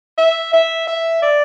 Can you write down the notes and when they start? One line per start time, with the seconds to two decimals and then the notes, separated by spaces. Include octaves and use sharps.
0.18 E5
0.53 E5
0.87 E5
1.22 D5